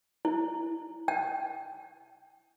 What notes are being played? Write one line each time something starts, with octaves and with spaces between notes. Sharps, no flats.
E4
G5